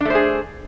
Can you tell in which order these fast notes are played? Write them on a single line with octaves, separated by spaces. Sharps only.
D4 A3 C5 G#4